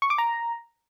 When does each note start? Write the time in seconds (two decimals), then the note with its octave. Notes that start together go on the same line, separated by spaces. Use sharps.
0.02 C#6
0.10 D6
0.18 A#5